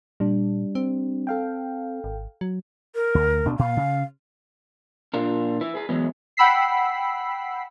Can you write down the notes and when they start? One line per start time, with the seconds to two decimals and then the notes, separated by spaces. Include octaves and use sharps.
0.20 A#2 G3 D4
0.75 C4
1.27 A4 F5 G5
2.04 G#1
2.41 F#3
2.95 A#4
3.15 D2
3.45 C#2 B2 D4
3.59 A#2 F5
3.77 C#3
5.14 A#2 D4 F4 A#4
5.61 E4 B4
5.75 G#4 B4
5.89 E3 F#3 G#3 B3
6.37 F#5 G5 B5 E6 B6 C7